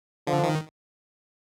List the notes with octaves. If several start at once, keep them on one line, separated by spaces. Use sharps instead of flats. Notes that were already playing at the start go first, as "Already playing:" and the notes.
D3 F3
D#3